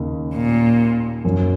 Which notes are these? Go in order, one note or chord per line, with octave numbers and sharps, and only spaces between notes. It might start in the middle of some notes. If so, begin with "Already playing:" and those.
Already playing: D#2 C#3 A#3 D#4
A#2
F#2 F#3 C#4